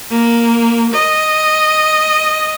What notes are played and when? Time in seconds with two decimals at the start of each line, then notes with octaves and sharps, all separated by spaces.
0.11 A#3
0.94 D#5